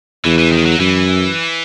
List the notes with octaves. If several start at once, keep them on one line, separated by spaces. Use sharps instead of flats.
E2 E3
E3
D#3
F#3
F#2 E3